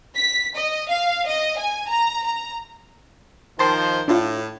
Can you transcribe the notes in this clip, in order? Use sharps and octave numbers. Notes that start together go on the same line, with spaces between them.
B6
D#5
F5
D#5
G#5
A#5
A#5
D#3 F3 C5 A5 C6
A2 D4 F4